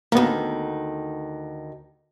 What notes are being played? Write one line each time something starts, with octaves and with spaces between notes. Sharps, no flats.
D2 D#3 A#3 B3